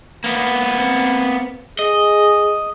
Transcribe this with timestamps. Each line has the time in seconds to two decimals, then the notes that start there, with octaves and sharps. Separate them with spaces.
0.24 A#3 B3
0.73 C4
1.79 G#4 D#5